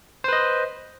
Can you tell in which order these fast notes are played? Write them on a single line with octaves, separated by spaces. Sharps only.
C5 B4 D#5